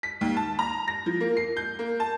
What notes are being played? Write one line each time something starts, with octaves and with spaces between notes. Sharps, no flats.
B6
D#2
A5
A#5
A#6
F3
A#3
C7
G6
A#3
A5